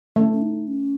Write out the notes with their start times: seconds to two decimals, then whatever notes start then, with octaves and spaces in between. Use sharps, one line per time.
0.16 A3 C#4
0.32 C#4
0.42 D#4
0.67 C#4